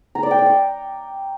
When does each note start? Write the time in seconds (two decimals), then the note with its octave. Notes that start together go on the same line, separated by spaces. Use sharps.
0.15 A#5
0.23 D5
0.31 G5
0.39 D5
0.46 C#6